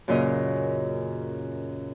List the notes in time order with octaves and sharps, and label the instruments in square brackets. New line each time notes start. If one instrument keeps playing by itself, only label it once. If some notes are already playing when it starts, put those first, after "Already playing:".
[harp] F#2 A#2 C#3 A#4 D#5